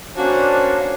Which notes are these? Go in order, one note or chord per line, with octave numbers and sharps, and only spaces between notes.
A#3 C#4 D4 F#4 C5